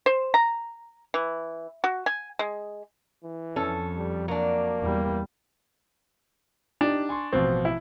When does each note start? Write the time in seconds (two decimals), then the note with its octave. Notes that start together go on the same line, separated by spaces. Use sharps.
0.06 C5
0.34 A#5
1.14 E3
1.84 F#4
2.06 G#5
2.39 G#3
3.24 E3
3.56 F2 C#4 A4
3.96 G3
4.28 F#3 A#3 D4
4.82 E2 G3
6.81 D4 D#4 G4 D5
7.09 G#5 C6 C#6
7.33 A1 B2 F3 C4
7.65 E4